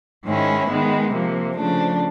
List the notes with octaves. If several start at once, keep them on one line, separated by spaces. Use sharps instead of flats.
G#2 D#3 G#3 C#4 E4
D#3 G#3 B3
C3 F3 A#3
C#3 F3 A3 D4